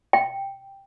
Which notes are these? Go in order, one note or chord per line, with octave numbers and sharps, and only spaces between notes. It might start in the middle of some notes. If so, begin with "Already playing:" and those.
G5